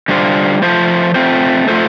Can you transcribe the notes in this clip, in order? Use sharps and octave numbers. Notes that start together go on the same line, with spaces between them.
D3 G3 D4 F4 C5
F3 A3 F4 C5
A3 C4 F4 C5
A3 F4 A4 C5